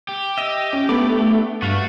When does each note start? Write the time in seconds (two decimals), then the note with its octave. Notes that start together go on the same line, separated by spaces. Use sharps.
0.09 G4
0.38 D#5 E5
0.73 C#4
0.89 A3 B3 D4 B4 B5 D6
1.62 G2 A3 F#4 F5